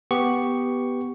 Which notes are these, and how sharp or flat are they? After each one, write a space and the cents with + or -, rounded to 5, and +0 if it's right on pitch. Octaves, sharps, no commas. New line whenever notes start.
B3 +0 G4 +0 C#6 +5